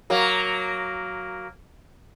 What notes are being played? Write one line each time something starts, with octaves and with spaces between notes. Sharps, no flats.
F#3 A#3